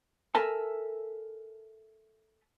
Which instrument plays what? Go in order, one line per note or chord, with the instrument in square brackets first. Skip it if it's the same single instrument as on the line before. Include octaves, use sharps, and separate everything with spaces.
[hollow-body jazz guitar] A4 A#4 E5 G#5 A5